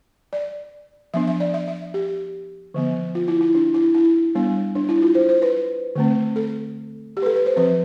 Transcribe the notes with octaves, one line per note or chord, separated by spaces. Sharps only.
D5
F3 B3 D4 E5
E5
D5
E5
E5
G4
D3 F3 B3
F4
E4
E4
D4
E4
E4
G3 B3 D4
D4
E4
F4
C5
C5
B4
D3 A3 C4
A4
G4
B4
A4
B4
C5
F3 C4 B4